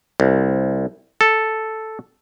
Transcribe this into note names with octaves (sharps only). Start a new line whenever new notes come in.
C2
A4